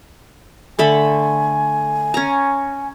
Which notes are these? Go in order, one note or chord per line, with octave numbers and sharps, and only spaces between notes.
D3 A3 G#5 B5
C#4 A#5